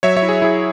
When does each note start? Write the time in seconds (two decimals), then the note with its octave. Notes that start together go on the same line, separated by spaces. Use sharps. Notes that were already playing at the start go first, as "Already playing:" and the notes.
0.03 F#3 C#5 E5
0.17 C#5 E5
0.22 E4
0.29 G#4
0.42 E4 G#4